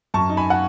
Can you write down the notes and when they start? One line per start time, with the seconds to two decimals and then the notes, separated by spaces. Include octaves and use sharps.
0.14 F#2 A5 C#6
0.29 D#4
0.37 G#5 B5
0.50 F#5